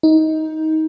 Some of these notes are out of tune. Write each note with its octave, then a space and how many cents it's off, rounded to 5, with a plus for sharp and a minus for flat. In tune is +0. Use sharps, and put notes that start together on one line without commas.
D#4 +20